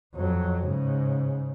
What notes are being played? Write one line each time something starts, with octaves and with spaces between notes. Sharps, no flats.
F2 F#3
G#2 C#3